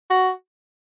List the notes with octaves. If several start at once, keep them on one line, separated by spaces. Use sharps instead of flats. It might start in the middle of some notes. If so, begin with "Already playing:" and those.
F#4